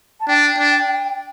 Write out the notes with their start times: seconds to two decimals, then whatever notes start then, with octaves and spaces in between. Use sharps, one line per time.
0.20 A5
0.28 D4 G5
0.58 D4